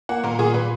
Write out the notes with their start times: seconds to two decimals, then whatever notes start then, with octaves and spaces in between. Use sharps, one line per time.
0.09 A#3 F#5
0.24 A#2 A#4
0.39 A#2 G#4
0.54 A#2 B4